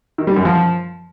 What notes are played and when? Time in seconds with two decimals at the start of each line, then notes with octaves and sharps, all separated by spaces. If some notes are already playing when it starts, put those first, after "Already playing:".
0.18 D#3
0.27 G3
0.36 F#2
0.45 F3